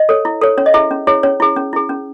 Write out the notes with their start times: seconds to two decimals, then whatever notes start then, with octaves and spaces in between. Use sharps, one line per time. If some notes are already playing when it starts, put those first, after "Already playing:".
Already playing: D#5
0.09 A4 C#5
0.25 E4
0.41 A4 C#5
0.58 C#4 C#5
0.66 D#5
0.74 E4 G#4 E5
0.91 C#4
1.07 E4 G#4 C#5
1.23 C#4 C#5
1.40 E4 G#4
1.56 C#4
1.73 E4 G#4
1.89 C#4